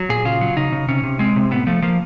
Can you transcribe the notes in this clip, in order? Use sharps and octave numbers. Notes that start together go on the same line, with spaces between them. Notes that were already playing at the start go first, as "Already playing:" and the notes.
Already playing: F#3
A#2 G#4
C#3 F4
F#3
C#3 D#4
C#3
C3 C#4
C3
G#3 C4
C3
A2 B3
F3 A3
F3 A#3